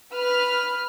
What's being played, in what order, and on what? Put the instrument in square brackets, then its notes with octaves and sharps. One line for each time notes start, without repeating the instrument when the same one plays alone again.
[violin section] B4 B5 F6